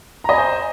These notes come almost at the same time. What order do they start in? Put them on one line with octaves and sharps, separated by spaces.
A#5 D#5 G#5 C5